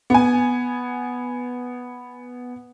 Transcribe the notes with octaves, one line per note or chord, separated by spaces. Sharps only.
B3 G#5